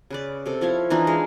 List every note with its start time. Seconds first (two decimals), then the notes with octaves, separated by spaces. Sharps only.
0.10 C#3 B4 D5
0.46 C3 A4
0.61 F3 E4 C#5 F5
0.90 E3 D4 D#4 F4
1.07 G#3 F5